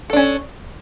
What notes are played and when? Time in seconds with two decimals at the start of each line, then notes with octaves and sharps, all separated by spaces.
0.10 A4
0.13 D4
0.16 C#4